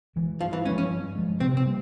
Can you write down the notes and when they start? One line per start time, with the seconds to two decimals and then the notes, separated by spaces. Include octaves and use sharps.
0.16 E3 G#3
0.41 G2 F3
0.53 E3
0.65 G#3 C#4
0.70 F3
0.78 C#4
0.90 G2
1.15 F3 G#3
1.40 C3 C4
1.57 C4
1.65 G3 A#3